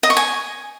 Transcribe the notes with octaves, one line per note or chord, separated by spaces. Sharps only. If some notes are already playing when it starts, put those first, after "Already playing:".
D#5
C#6
G#5